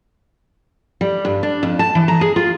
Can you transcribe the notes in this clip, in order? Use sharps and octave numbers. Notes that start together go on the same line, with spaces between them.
G3
G2
D4
F2
A5
E3
A#5
G#4
F4